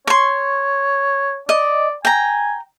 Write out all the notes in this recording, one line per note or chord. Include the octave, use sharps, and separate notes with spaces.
C#5 C6 C#6
D5 D#5
G5 G#5 A#5